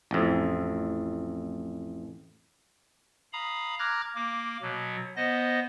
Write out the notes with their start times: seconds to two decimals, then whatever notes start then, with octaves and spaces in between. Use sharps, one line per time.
0.11 A1 F2
3.33 F5 A#5 B5 D#6
3.79 A#5 D6 F6 F#6 G#6 A#6
4.15 A#3 D6
4.62 B2 F#3
5.16 B3 C5 D#5 A#6